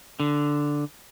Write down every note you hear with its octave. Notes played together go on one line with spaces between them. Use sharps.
D3